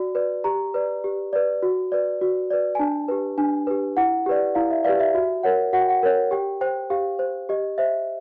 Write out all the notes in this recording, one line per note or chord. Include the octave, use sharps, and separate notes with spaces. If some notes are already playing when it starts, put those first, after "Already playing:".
Already playing: F#4 D5
B4 D5
G4 A#5
B4 D5
G4
B4 D5
F#4
B4 D5
F#4
B4 D5
G#5
D4 A5
G4 B4
D4 G#5
G4 B4
E4 F#5
G4 B4 D5
E4 F5
E5
G4 B4 D5 F5
E5
F#4 E5
A#4 C#5 F#5
F#4 F#5
G5
F#5
A#4 C#5
G4 G5
C5 G5
G4 F5
C5
G4 D#5
C5 E5